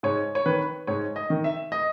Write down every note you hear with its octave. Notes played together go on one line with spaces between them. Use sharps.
G#2 C#5
C#5
D#3 B4
G#2 C#5
D#5
D#3
E5
D#5